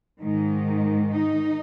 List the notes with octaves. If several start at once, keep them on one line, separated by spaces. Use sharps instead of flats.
G#2 D#3
D#4